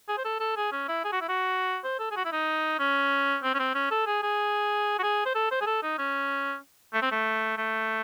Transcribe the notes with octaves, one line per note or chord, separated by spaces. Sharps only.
G#4
C5
A4
A4
G#4
C#4
E4
G#4
F#4
E4
F#4
C5
A4
G#4
F#4
E4
D#4
C#4
C4
C#4
C4
C#4
A4
G#4
G#4
F#4
G#4
C5
A4
C5
G#4
A4
D#4
C#4
A3
C4
A3
A3